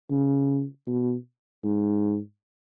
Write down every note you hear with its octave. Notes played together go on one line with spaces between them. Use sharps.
C#3
B2
G#2